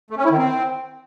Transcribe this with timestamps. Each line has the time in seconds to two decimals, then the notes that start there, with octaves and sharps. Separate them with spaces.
0.11 A3
0.17 C#4
0.24 E4
0.31 D#3
0.38 C4